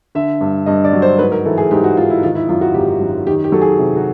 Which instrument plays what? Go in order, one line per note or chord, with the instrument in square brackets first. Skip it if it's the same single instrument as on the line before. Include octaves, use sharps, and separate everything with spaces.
[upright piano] D3 [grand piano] E5
[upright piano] G2
[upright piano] G2 [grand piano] D#5
[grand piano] D5
[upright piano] F#3
[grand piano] C5
[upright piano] G#2 [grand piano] B4
[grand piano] A#4
[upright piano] E3 [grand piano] A4
[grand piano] G#4
[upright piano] G#2 [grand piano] G4
[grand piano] F#4
[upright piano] G#2 [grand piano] F4
[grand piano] E4
[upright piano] D#3 [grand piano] F4
[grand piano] E4
[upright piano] F#2 [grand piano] F4
[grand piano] F#4
[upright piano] G#1 [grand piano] G4
[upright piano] F#2
[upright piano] D#3 [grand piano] G4
[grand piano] G4
[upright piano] F#3 [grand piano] A4
[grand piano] G#4
[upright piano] C3
[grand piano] F#4